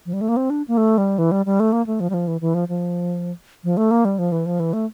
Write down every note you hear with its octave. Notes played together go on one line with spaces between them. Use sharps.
F3
G3
A3
A#3
C4
D4
A#3
A3
G3
E3
G3
G3
A3
A#3
A3
F3
G3
F3
E3
E3
F3
F3
F3
A3
A#3
G3
F3
E3
F3
E3
A3